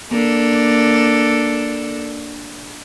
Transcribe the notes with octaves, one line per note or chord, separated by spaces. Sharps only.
A#3 D4 A4